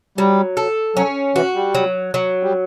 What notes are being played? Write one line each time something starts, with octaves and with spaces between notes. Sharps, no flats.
F#3 G3
A4
F#3 C#4
E3 F#4
G3
F#3
F#3
G3